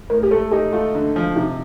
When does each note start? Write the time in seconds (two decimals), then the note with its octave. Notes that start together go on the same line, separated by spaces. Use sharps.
0.10 A2 A#4
0.23 G4
0.31 A3 A4
0.52 D#4 G4
0.72 A3 F4
0.95 D3
1.16 F3
1.36 C3 D#4